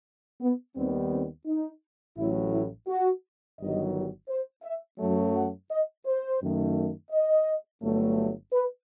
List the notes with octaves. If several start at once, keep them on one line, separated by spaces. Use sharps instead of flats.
B3
D#2 D#3 G3 B3 C4
C4
D#4
A1 A2 F#3 E4
E4
F#4
G1 G2 D#3 F#3 D#5
C5
E5
F#2 F#3 A3
F#5
D#5
C5
F#2 D#3 A3
D#5
G1 G2 F#3 A3
B4